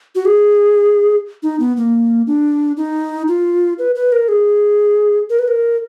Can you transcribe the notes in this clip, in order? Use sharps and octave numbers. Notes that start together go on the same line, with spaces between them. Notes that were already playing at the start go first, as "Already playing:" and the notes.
F#4
G#4
D#4
B3
A#3
D4
D#4
F4
B4
B4
A#4
G#4
A#4
B4
A#4